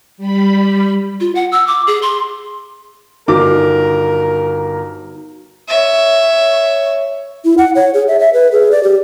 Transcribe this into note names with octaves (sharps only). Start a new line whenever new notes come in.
G3 B5
F4
F#5
E6
D6
G#4
C6
G1 D#4 F#4 A#4 D6
C#5 E5
E4
F#5
C#5
G#4
E5
E5
B4
G#4
D5
G4